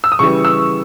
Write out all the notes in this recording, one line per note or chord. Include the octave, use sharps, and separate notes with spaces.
E6
D#6
C#3 E3 G3 C#6
E6